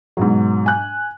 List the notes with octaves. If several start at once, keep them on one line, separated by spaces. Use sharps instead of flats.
G#2 B2 F#3
G#5 F#6